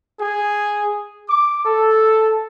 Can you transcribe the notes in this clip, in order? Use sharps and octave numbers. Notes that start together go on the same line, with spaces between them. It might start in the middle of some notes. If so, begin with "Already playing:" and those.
G#4
D6
A4